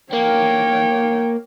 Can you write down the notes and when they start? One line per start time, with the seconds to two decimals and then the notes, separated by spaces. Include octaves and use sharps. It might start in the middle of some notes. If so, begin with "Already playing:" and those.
0.13 A#3 C#5 G5